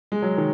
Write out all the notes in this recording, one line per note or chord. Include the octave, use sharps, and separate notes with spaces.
G#3
F#3
D#3